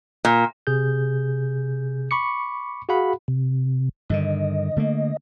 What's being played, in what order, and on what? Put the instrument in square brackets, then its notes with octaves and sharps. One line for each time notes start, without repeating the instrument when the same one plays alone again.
[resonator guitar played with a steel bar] A#2
[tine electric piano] C3 G#4 G6
B5 C#6 D6 C#7
F#4 G#4 F5 F#5 B5
[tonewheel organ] C3
[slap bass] G2 D3 D#3 [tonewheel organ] D#5
[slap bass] D3 A3 A#3